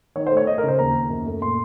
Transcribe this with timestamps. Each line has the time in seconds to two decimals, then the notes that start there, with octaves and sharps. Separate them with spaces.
0.16 D#3 C#5
0.27 C5
0.31 A3
0.37 C#5
0.47 A3 D#5
0.58 A#4
0.63 C#3 C5
0.79 D#2 A#5
0.95 D#2
1.10 F#2
1.26 A3
1.42 A#2 C6